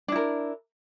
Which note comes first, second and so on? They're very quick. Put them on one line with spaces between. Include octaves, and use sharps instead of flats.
D4 E4 A#4